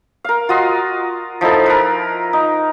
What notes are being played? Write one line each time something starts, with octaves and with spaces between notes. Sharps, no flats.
A#4 F5
F4 F#4 D#5 C6
F3 D#4 E4 A4
A#4 B4
D#4